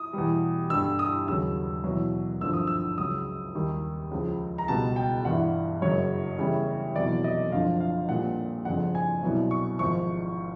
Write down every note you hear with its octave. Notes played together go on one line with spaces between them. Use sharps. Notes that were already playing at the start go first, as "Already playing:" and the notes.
Already playing: D#6
E2 B2 G3
G1 G2 D3 G3 E6
D#6
D#2 C#3 F#3 E6
E2 B2 F#3
G#1 G2 D3 F3 E6
D#6
E6
C#2 C#3 F#3 D#6
D#2 D#3 G3
C#2 C#3 F3
A#5
C#2 B2 G3 A5
G5
G1 G2 E3 F#5
F#1 F#2 C#3 F#3 C#5
E2 C#3 E3 G3
F1 E2 B2 F#3 D5
D#5
F#1 F2 D3 F3 F5
F5
A#1 A#2 G3 F#5
G1 F2 C#3 F3 F#5
G#5
C2 B2 F#3
C#6
G#1 G#2 F3 C#6